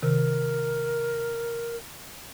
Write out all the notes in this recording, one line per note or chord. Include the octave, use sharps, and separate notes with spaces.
C3 D#3 A#4